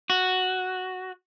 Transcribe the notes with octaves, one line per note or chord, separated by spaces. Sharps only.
F#4